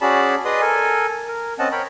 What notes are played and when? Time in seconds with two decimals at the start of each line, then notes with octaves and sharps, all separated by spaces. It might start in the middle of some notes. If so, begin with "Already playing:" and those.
0.01 C#4 F#4 G#4 D5 A5 B5
0.45 G#4 B4 D5 D#5 C6 D#6
0.61 A4 A#4 G#5
1.28 A#4
1.59 C4 C#4 D#5 F#5 A5
1.72 A#4 C#5 G5 B5